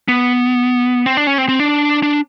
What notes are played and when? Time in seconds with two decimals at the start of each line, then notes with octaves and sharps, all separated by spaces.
0.08 B3
1.06 C4
1.17 D4
1.27 C#4
1.38 C4
1.49 C4
1.60 D4
2.03 D4